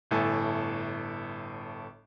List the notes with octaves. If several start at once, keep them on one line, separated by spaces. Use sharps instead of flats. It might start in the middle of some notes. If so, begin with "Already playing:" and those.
G1 A2 E4 A4 G#5 A5